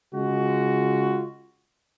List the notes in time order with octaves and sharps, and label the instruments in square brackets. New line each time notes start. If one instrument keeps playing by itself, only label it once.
[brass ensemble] C#3 G#3 F4 F#4